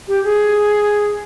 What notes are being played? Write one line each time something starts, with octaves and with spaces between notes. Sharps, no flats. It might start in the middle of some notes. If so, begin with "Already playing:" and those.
G4
G#4